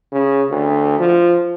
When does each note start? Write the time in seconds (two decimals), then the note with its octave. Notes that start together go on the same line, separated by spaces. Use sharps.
0.12 C#3
0.50 D2
0.99 F3